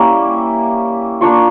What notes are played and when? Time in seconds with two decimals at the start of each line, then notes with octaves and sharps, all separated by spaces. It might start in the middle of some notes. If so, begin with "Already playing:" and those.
Already playing: G3 A#3 C#4 E4
1.21 A#3 D4 F4 C#6